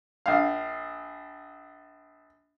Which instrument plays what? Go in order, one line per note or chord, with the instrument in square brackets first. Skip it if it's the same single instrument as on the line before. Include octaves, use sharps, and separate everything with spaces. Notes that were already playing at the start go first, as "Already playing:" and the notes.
[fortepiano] A#1 F5